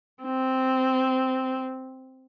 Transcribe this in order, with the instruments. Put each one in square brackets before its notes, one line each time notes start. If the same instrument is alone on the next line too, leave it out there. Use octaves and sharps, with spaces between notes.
[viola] C4